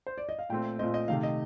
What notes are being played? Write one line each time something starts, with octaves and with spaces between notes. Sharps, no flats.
C5
D5
D#5
F5
A#2 A3 C4 G5
A#2 A3 C4 D#5
D#5
C3 D#3 A3 F5
D#5